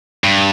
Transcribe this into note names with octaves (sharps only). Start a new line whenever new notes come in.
G2